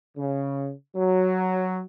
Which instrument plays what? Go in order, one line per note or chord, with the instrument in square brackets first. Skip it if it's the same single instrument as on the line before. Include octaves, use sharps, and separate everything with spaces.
[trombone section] C#3
F#3